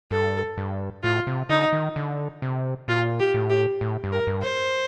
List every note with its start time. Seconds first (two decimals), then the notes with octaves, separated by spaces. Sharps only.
0.11 G2 A4
0.58 G2
1.03 A2 F4
1.27 C3
1.49 D3 D#4
1.73 D#3
1.96 D3
2.42 C3
2.88 A#2 F4
3.19 G4
3.34 A2
3.50 G4
3.81 A2
4.04 G2
4.12 A#4
4.27 G2
4.42 C5